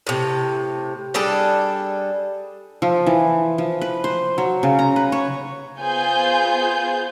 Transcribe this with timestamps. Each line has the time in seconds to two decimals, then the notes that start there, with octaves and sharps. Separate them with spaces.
0.07 A2 C3
1.14 G3 D4 G#4 A4
2.82 F3
3.06 E3
3.58 F3
3.81 B4
4.04 C5
4.38 F#3
4.63 C#3
4.79 A#5
4.96 B4
5.12 C#5
5.81 B3 F4 G#4 C5 G#5 G6